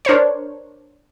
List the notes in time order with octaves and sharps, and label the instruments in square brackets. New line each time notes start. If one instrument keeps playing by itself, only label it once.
[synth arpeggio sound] D4 A#4 C5 C#5